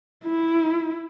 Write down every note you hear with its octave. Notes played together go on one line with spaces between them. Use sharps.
E4